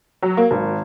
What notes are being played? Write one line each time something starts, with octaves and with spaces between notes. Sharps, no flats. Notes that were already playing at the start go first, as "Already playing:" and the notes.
F#3
A#3
G#1